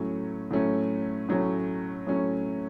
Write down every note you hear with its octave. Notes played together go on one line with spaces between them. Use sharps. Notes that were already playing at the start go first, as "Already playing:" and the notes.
Already playing: A2 F#3 A3 C#4
A2 F#3 A3 C#4
A2 F#3 A3 C#4
A2 F#3 A3 C#4